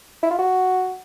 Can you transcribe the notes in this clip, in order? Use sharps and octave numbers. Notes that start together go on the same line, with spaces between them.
E4
F4
F#4